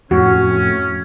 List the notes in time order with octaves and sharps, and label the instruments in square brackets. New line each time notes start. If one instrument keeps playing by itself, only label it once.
[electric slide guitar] F2 A2 [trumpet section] C#4 [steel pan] F#4